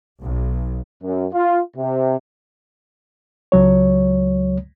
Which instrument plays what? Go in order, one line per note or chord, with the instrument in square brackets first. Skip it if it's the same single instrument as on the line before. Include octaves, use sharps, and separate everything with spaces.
[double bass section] B1
[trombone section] F#2
F4
C3
[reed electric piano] C#2 F#3 C#5